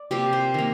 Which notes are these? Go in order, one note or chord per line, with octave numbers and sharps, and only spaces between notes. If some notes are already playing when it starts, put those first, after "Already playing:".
Already playing: D5
C3 F3 A#3 G4
C5
D#3 A#3